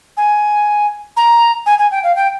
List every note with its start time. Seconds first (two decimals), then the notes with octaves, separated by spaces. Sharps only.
0.17 G#5
1.17 A#5
1.66 G#5
1.78 G#5
1.91 G5
2.03 F5
2.16 G5